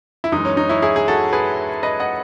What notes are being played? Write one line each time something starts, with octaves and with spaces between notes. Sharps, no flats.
E4
F#2 E3 G#3 D#4
C#4
D#4
C#4 E4
E4 G#4
G#4
F#4 A4
G#4 B4
B4 D#5
D#5 F#5